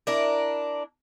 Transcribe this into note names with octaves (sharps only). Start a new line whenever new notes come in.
D4 E4 A#4